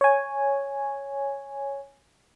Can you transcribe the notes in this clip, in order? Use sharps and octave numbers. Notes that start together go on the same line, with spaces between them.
C#5 G#5